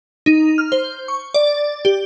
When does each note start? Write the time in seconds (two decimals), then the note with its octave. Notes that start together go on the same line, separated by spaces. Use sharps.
0.26 D#4
0.58 F6
0.72 C5
1.08 C#6
1.34 D5
1.85 G4